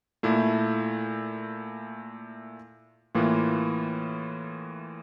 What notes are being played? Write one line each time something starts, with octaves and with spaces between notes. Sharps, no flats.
A#2 A3 E4
A2 E3 A#3 F4